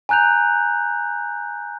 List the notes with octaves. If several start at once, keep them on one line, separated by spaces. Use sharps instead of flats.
G#5 A#5 F#6 G6 F7